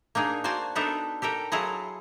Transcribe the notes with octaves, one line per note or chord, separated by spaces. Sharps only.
A#3 D4 D#4 G#4
A#3 F#4 C5 D5 G#5 A5
B3 D4 D#4 A4 E5 F#5
G4 A4 A#4 G5
F#3 E4 F4 G#4 A4 D#5